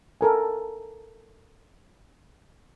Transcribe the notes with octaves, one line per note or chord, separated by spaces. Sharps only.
A4 A#4 G#5